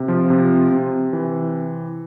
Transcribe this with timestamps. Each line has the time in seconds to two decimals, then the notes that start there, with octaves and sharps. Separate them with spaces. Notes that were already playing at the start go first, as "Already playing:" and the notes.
Already playing: C3
0.08 F3 F4
0.30 C3
0.72 C3
1.13 E3